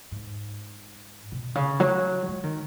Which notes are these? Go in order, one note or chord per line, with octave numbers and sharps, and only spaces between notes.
G#2
B2
C#3
F#3
G#3
D#3